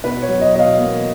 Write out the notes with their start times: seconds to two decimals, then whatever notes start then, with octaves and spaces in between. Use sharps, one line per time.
0.03 B2 B4
0.22 C#5
0.29 F#3
0.41 D#5
0.53 B2 D#5
0.60 F5
0.79 A#3